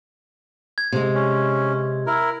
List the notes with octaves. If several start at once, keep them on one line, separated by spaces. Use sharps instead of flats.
G#6
C3 G#3
C#4
E4 A#4